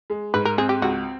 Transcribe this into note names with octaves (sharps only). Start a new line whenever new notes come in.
G#3
G#2 B4
A#4
C4 G#4
G4
C#2 F#4